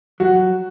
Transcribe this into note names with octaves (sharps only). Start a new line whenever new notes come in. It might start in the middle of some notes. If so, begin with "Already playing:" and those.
F#3 F#4